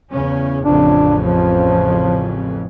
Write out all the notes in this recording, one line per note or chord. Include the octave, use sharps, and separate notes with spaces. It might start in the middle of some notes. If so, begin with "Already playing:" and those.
E2 C#3 C#4
A1 F2 C#3 D4
F3